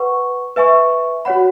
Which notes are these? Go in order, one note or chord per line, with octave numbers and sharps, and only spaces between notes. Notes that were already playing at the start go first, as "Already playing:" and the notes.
Already playing: B4 F#5 C#6
B4 E5 G#5 C#6
F#4 C#5 F#5 B5